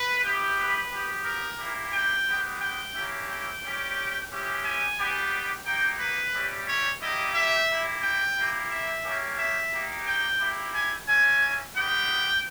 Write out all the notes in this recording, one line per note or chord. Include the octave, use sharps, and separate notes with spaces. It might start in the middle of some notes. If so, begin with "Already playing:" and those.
Already playing: B4
B3 E4 G4
B4
B3 G4
A#4
A#3 E4 G4
G5
G#3 B3 G4
G5
A#3 C#4 E4 G4
G5
G3 C#4 G4
G#3 C#4 E4 G4
G#5
G3 B3 G4
A#3 D#4 G4 G5
B4
G3 C#4 E4 G4
C#5
G3 A#3 E4 G4 D#5
E5
A#3 E4 G4
G5
A#3 E4 G4
E5
A#3 C#4 G4
E5
A#3 D#4 G4
G5
A#3 E4 G4
G#5
A#3 C#4 E4 G#5
G#3 B3 D#4 G4 G5